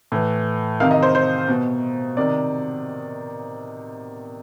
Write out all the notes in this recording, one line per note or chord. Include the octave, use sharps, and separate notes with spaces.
A2 E3
C3 D#3 F5
D#5
C5
C5
B2
C3 D#3 D5